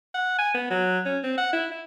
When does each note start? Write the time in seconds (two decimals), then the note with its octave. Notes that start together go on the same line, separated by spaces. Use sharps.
0.14 F#5
0.39 G#5
0.54 B3
0.70 F#3
1.05 C#4
1.23 C4
1.38 F#5
1.53 E4
1.71 E4